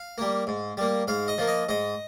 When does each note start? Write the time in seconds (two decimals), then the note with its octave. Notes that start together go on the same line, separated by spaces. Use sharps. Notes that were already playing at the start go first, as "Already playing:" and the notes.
Already playing: F5
0.18 G3 A#3
0.47 G#2
0.77 G3 A#3
1.07 G#2 F5
1.28 D#5
1.38 F3 A#3
1.47 D#5
1.69 G#2 D#5